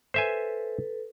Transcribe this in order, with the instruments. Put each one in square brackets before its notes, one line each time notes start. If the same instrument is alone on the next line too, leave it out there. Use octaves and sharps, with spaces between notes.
[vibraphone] A4 B4 [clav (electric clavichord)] C5 E5 G#5